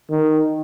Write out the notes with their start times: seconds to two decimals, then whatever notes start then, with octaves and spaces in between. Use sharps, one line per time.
0.10 D#3